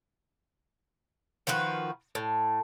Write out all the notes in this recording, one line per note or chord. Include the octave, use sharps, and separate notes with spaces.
D#3 F3 F#4 B4
A2